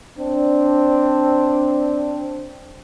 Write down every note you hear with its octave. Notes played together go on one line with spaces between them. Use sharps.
C4 D4